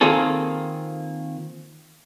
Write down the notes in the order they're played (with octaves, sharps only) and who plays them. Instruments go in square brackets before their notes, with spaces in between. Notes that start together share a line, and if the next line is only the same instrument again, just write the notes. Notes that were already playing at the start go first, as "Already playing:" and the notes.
[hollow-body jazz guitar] D#3 A#3 C4 F4 G#4 A4